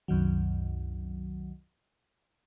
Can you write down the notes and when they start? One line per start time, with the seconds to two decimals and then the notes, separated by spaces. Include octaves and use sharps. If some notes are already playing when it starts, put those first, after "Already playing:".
0.08 C2 F#2 D#3 F#3